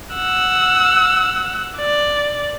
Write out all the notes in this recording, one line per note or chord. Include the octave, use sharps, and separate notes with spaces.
F#5 E6
D5